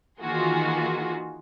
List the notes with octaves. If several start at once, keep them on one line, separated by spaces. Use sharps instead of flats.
D#3 E3 A#3 F4 F#4 G#4